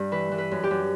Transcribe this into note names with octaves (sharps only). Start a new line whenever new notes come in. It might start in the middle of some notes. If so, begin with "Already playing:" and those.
Already playing: G2
E3 B4
E3
B4
F#2
G4
F#2